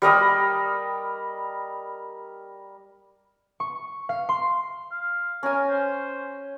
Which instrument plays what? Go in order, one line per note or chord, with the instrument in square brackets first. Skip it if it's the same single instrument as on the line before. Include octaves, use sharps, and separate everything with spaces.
[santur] G3 A#4 D#5 B5
[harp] C#6
F5
C6
[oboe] F5
[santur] C#4 G#5 [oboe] A#4
[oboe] C5